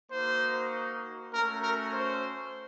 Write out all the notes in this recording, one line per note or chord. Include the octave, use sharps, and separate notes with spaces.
A#3 D#4 F#4 C5
A3 C#4 F#4 A#4
A#4
C5